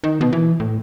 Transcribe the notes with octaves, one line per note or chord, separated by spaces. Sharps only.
D#3
B2
E3
A2